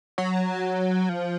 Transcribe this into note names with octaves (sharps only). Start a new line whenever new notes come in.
F#3
F3